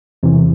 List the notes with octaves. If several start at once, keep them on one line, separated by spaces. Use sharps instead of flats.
E2 C3 E3